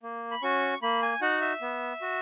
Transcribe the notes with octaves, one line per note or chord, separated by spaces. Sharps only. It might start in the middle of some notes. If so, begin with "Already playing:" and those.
A#3
B5
C#4 F#4 C#6
A#3 B5
G#5
D#4 F#4 F#5
E5
B3
F#4